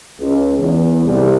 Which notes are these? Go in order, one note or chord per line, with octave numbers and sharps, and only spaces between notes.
C#2
E2
C2